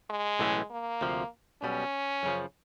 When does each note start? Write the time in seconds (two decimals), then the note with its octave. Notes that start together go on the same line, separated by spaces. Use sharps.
0.10 G#3
0.39 B1 A2 E3 A3 C#4
0.71 A#3
1.01 D2 C3 F3
1.62 B1 B2 G3 C#4
2.23 F#2 C#3 F3